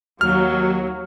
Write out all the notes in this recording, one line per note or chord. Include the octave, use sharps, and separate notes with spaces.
D#2 F#3 F6